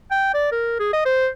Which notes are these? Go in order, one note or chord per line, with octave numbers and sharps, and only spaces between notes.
G5
D5
A#4
G#4
D#5
C5